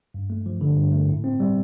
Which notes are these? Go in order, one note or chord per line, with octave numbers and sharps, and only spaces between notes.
G2
A3
F3
D3
G2
A3
A2
C4
G3